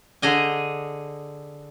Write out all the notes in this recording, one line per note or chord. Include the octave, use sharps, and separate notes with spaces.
D3 G#4 D#5 G#5